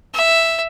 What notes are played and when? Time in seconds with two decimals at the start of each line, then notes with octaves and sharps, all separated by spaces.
0.14 E5